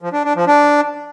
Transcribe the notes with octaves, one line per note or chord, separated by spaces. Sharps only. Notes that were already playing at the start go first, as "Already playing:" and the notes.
F3
D4
D4
F3
D4